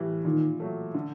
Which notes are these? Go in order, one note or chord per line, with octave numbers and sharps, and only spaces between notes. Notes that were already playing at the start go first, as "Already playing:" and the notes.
Already playing: A2 E3 G3
A#2 D#3
F#3 A3
D3